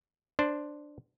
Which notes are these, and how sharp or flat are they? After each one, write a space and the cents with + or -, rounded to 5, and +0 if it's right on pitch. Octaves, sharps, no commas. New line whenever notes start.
D4 +5 C5 +0